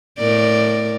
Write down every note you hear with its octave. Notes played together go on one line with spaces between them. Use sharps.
A2 A#4 D5